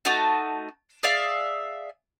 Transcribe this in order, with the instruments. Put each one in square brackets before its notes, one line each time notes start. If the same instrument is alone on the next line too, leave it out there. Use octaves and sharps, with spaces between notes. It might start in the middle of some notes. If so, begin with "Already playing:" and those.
[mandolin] A3 D#4 F#4 A5
G#4 D5 E5 F5